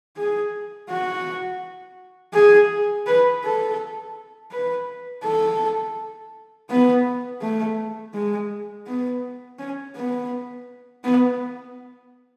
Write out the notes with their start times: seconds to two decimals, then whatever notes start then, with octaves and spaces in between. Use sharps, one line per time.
0.17 G#4
0.89 F#4
2.34 G#4
3.07 B4
3.44 A4
4.52 B4
5.24 A4
6.69 B3
7.41 A3
8.14 G#3
8.86 B3
9.59 C#4
9.95 B3
11.04 B3